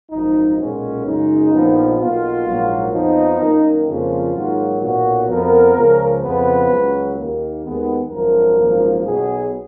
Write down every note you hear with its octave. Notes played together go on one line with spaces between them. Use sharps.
G#1 F#2 F3 D#4
B1 A#2 G#3 B3 C#4
F#2 C#3 G#3 D#4
A#1 A#2 F3 B3
B1 B2 A#3 F4
A#1 G#2 F#3 A#3
F2 F3 B3 D#4
F#2 D#3 A#3
F2 C#3 F3 A#3 F4
G#2 D#3 F#3 A#3
B1 A#2 F#3 B3 F#4
F2 F3 B3 A#4
C#2 C#3 F3
F2 C#3 F3 B3 B4
C#2 C#3 F#3
D#2 D#3 A#3
D#2 D#3 G#3 B3
G#1 F#2 F3 A#4
G#1 F#2 F3 A#3
B1 B2 F#3 B3 G#4